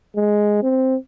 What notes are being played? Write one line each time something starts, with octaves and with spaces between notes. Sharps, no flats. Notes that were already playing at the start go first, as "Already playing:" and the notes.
G#3
C4